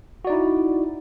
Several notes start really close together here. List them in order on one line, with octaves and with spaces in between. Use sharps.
F#4 D5 D#4 E4